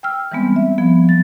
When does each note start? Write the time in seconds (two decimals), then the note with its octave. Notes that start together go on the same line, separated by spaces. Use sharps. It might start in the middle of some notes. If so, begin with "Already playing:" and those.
0.03 G5 E6 F6
0.32 E3 G3 G#3 B3 C4
0.56 E5
0.78 F3 B3
1.05 F#3 A6